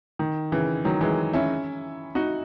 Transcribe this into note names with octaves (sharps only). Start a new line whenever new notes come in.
D#3
C#3 E3
D#3 F#3
E3 G#3
C#4 E4
D#4 F#4